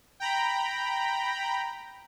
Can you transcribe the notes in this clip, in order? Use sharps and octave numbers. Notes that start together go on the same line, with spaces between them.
G5 A#5 B5